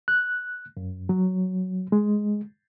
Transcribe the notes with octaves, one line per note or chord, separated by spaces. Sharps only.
F#6
F#2
F#3
G#3